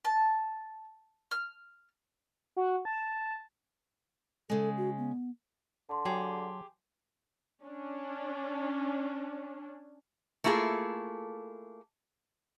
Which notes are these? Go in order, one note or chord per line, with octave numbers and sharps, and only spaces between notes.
A5
F6
F#4
A5
C#3 G#3 A4
F#4
B3
D3 A5 C6
F#3 G4 G#4
C#4 D4
A3 A#3 E4 F4 G#4 A4